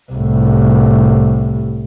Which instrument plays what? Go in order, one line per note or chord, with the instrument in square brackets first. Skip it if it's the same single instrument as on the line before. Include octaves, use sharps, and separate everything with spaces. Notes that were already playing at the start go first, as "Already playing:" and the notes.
[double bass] C2 A2